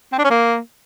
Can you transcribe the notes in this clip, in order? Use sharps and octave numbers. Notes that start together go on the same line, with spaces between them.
C4
D4
C#4
A#3